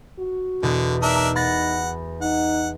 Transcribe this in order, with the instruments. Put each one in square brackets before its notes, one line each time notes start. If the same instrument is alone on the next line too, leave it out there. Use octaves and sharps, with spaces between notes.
[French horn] F#4
[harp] E2 B2 [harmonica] D3
[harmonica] D4 A#4 E5 [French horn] D#4
[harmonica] F#5 [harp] B5 A6 A#6
[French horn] D#4 [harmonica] F#5